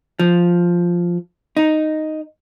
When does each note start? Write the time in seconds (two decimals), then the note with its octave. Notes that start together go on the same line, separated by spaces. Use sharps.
0.19 F3
1.57 D#4